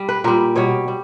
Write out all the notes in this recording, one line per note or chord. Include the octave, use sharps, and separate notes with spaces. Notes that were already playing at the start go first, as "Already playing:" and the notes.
Already playing: G3
B4
A#2 G3 A#4
B2 G3 C#5
G3